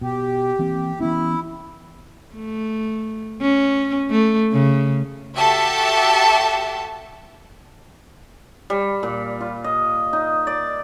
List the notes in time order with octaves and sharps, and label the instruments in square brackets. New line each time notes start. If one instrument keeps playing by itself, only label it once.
[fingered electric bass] B2 [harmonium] G4
[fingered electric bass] E3 A#3 C4
[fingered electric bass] E3 B3 C#4 [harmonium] E4
[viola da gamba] A3
C#4
A3
C#3
[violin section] F#4 G4 A4 E5 A5
[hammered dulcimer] G3
A#2
F4
D#5
D#4
D5